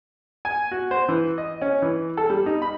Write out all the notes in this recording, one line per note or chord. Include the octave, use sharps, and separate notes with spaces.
G#5
F#4
C5
E3
D#5
C#4
E3
A4
G3
D#4
B5